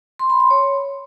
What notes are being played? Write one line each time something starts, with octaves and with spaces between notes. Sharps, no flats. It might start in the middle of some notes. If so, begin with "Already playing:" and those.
C6
B5
C6
C#5